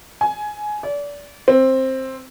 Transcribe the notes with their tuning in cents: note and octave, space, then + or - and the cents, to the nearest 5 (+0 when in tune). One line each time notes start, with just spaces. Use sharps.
G#5 +15
D5 -30
C4 +10